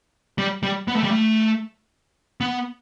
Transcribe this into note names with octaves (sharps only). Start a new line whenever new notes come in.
G3
G3
B3
A3
G3
A3
B3